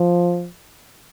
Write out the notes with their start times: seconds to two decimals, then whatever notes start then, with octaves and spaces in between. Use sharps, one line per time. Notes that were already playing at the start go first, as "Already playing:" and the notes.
Already playing: F3